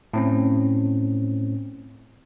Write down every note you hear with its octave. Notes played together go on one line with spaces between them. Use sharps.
A2 C4 C#4